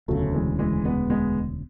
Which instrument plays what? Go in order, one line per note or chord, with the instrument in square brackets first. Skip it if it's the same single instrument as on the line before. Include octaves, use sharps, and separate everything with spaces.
[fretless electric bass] E1 D2 C#3 [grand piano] F#3 A3
[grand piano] E3 G#3
E3 G#3
G#3 B3
G#3 B3